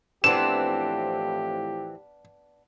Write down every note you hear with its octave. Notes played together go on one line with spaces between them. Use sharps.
A2 E3 F3 B3 C4 D4 G4 E7